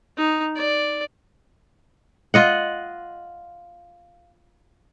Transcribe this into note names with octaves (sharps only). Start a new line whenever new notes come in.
D#4
D5
F4 D#5 F#5